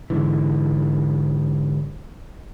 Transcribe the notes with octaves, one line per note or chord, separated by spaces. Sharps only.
G#2 D3 E3